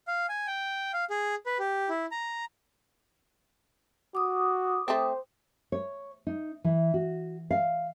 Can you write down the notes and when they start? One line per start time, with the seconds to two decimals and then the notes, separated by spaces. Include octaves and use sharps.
0.07 F5
0.29 G#5
0.47 G5
0.93 F5
1.10 G#4
1.46 B4
1.59 G4
1.89 E4
2.11 A#5
4.15 F#4 D6 D#6
4.88 A3 C4 C5
5.72 C#5
6.27 D#4
6.64 E3
6.94 F#4
7.51 F5